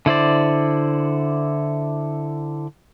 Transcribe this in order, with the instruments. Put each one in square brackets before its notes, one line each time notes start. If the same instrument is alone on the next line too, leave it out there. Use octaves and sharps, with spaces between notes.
[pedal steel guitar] D3 E4 C5 D5